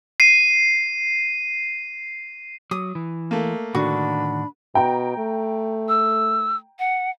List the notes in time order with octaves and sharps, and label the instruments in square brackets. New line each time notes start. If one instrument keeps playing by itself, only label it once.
[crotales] C7 D#7
[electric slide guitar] F#3 [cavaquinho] D#6
[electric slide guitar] E3
[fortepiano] A3 A#3
[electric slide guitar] A2 D3 D#3 [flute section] D4 B5 [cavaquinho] F#4
[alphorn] B2 [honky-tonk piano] G5 A#5
[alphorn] A3
[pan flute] E6
F#5